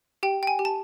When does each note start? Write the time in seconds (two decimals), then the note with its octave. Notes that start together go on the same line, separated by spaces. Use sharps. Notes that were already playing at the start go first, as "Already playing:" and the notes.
0.23 G4 G5
0.43 G5
0.47 G#5
0.59 G4
0.65 A5